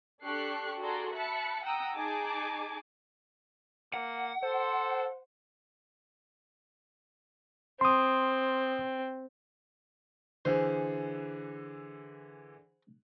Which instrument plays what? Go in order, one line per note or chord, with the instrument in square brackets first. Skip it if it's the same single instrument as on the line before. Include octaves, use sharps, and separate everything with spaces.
[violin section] D4 G4 A4 C#6 F#6 C7
F#4 G#4 A4 D5 A#5 C6
E5 A5 B5 F#6 C#7
F#5 G5 A#5 D#6 E6
D#4 G#4 G#5 A5 D6
[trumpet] A#3 [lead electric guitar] F#5
[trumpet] A4 [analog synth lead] C5
[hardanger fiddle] C4 [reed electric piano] C6 D#6
[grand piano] D3 E3 G#4 [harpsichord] C5